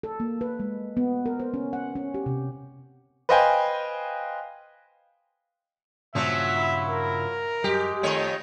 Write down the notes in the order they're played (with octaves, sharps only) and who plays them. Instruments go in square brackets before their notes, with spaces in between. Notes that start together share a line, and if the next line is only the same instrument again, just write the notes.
[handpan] A4
A#3
B4
G#3
B3
A#4
C5
C#4
F#5
C#4
G4
C3
[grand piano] B4 C5 D#5 F5 G5 G#5
[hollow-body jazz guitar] G2 A#2 C#3 [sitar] F3 F#3 [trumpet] E5
[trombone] E4
[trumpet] A#4
[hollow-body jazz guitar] F#2 G3 [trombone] G#3 [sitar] G4
[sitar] F2 D#3 C#5 [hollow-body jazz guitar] A3